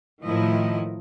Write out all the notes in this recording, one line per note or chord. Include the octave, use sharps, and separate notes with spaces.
A2 D#3 F3 E4 D#5